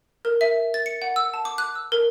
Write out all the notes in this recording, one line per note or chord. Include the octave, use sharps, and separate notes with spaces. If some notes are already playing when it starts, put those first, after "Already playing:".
A#4
E5
A6
C#7
F#5
E6
A5
D6
F#6
E6
A#4